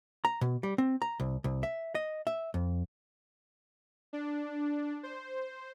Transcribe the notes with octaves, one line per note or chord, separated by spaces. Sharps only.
A#5
B2
G3
C4
A#5
C2
C2
E5
D#5
E5
F2
D4
C5